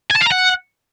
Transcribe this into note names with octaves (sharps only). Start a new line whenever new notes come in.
G#5
A5
F5
A#5
F#5